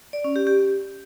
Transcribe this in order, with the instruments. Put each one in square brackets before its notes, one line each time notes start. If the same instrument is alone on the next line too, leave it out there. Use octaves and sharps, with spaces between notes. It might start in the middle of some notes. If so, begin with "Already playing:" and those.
[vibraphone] D5
C#4
G4
G4